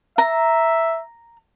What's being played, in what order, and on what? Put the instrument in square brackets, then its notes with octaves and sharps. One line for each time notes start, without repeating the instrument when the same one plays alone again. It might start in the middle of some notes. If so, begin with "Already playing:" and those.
[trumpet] E5 [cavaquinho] A#5